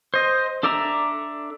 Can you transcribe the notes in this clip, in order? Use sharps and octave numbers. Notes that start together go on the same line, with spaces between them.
C5 D#5
D4 A4 D5 E5 A#5